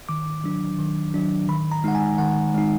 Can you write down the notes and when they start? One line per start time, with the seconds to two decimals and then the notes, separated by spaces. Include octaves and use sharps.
0.09 D#3 D6
0.44 F#3 D4
0.78 D#3
1.14 F#3 D4
1.49 D#3 B5
1.72 A#5
1.84 G#3 D#4 F#5
1.95 G#5
2.18 D#3 F#5
2.54 G#3 D#4